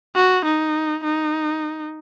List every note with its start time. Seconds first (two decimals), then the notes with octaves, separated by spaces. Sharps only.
0.15 F#4
0.45 D#4
1.04 D#4